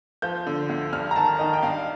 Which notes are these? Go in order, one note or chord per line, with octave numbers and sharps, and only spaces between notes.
F3 G6
D3
D2
G2 F6
A#5
D#3 A5
D#3 D#5
G5
G2 F5